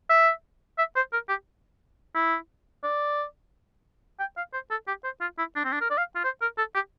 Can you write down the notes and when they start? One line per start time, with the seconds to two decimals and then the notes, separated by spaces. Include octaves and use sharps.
0.10 E5
0.78 E5
0.96 C5
1.13 A#4
1.29 G4
2.15 E4
2.83 D5
4.19 G5
4.37 F5
4.53 C5
4.70 A4
4.87 G4
5.04 C5
5.21 F4
5.38 E4
5.56 D4
5.64 C4
5.72 D4
5.81 A#4
5.90 D5
5.98 F5
6.15 F4
6.24 C5
6.41 A#4
6.58 A4
6.74 G4